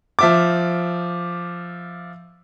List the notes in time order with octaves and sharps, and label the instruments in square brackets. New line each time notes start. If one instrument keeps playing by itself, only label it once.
[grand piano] F3 E5 D6